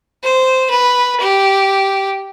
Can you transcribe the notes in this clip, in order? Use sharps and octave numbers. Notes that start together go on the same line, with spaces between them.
C5
B4
G4